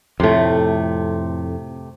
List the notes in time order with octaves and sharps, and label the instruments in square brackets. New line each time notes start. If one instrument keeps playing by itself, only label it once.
[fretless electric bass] F2 A2 [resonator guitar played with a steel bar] C3 A3